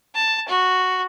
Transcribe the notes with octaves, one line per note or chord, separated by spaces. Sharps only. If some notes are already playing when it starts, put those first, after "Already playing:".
A5
F#4